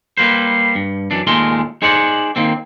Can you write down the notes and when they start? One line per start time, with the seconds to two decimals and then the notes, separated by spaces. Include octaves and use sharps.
0.17 G3 A#3 B4 C5
0.75 G2
1.11 F#2 E3 D4
1.27 D#2 A#2 G#3 A3 A#4 C6
1.82 D#4 G#4 C5 D5 F#5
2.36 D#3 A#3 C4